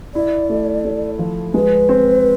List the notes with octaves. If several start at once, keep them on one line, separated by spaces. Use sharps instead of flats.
E4 D5
A3
A3
F3
G#3 B4
C4